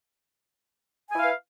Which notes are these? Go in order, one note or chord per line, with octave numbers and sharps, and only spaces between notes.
E4 B4 F5 G#5